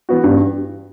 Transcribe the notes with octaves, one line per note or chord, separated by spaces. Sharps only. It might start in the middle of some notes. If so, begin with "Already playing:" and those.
E3 B3 F#4
G2